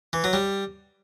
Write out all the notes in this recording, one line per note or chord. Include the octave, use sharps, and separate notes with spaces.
E3
F#3
G3